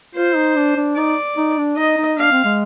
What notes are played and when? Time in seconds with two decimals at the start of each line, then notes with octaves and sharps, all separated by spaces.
0.15 F4 C5
0.36 D#4
0.56 D4
0.76 D4
0.97 D#4 D5
1.37 D#4
1.58 D4
1.77 D#4 D#5
1.97 D#4
2.18 D4 F5
2.31 C4
2.44 G#3